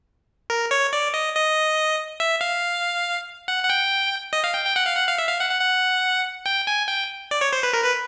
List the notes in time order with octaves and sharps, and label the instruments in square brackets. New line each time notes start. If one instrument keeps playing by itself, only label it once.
[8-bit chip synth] A#4
C#5
D5
D#5
D#5
E5
F5
F#5
F#5
G5
D#5
F5
G5
G5
F#5
F5
F#5
F5
E5
F5
F#5
F#5
F#5
G5
G#5
G5
D5
C#5
C5
B4
A#4
B4